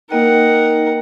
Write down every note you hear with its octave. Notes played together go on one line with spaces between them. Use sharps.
A#3 D#4 A#4 D#5 F#5 G5